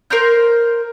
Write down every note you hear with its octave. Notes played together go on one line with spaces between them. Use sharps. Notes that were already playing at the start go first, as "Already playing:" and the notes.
A#4 C5 A#5 G6